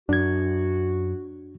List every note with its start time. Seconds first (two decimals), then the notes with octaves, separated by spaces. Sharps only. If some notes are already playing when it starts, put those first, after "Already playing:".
0.09 F#2 D4 F#4 G#6